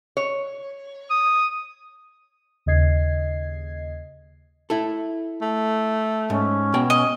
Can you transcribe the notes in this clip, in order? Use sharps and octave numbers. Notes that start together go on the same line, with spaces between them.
C#5
D#6
D#2 C#3 D#5 G#6 C7
E4 A4
A3
G#2 C#4
B2 G5
D#5